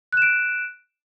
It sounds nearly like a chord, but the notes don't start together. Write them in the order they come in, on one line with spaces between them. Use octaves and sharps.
F#6 E7 D7